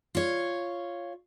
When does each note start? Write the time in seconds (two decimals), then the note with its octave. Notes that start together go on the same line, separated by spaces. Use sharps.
0.15 F4 C#5